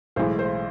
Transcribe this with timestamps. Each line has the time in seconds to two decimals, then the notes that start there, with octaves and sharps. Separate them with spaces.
0.16 B1 A2 E3 G#3 C5
0.39 C5